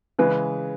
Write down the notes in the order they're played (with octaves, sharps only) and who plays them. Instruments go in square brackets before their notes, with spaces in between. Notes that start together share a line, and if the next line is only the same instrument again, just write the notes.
[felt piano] C#3 E3 G#3 [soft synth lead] B4